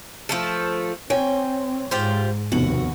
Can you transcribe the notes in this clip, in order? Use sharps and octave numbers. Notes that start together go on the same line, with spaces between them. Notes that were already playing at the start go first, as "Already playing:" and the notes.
F3 A3 A4
C4 C#5 G5 G#5
G#2 F4 G4 C5
F1 D#2 B2 F#4 F#7